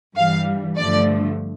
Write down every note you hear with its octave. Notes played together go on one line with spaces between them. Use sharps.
G2 E3 G3 F5
G2 D3 F3 A3 D5